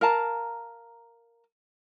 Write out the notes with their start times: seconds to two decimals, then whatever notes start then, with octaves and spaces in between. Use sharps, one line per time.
0.01 A#4 F5 A5 A#5